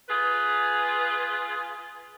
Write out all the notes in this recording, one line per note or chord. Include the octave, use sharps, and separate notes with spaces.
F4 G#4 B4